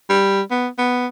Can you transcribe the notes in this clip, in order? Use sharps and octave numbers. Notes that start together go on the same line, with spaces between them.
G3
B3
B3